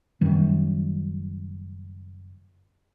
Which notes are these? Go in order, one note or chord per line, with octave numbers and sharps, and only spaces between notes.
F#1 F#2 D#3 G3